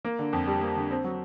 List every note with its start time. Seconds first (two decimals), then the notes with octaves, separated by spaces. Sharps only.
0.05 A#3
0.19 D3
0.33 F2
0.47 G3
0.61 A#3
0.76 D3
0.91 C4
1.04 F#3